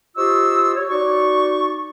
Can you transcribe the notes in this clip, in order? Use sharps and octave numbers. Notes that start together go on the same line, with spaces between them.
F4 G4 C5 D#5 C#6 E6
C#5
D#4 F#4 D5 C#6